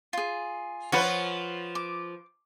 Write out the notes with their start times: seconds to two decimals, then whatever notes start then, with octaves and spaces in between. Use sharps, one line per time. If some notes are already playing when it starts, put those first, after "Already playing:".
0.13 F4 G#4
0.92 F3 F4 B4 C#5 F#5 D#6
1.75 D6